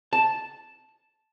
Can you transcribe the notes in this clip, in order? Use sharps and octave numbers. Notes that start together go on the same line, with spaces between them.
A5